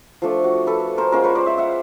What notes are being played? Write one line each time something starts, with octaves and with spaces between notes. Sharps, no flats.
F3 A3 D4
F#4
A4 B4
A#4 C5
G#3 C#4 F4 A#4 C5
B4 C#5
C5 D5
D5 E5
E5 F#5